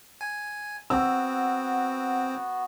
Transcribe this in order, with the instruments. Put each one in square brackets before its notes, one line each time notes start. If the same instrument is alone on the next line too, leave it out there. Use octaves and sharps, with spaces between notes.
[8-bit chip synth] G#5
[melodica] B3 F#4 [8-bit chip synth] C4 [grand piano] E6